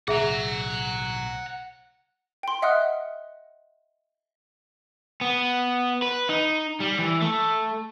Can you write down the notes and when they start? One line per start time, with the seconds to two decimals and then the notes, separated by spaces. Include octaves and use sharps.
0.08 B1 A2 C#3 G#4 E5 F#5 A#5
2.43 G5 C6
2.62 D#5 E5 F#5 D#6 F6 F#6
5.21 B3
6.02 B4
6.29 D#4
6.80 G3
6.98 E3
7.22 A3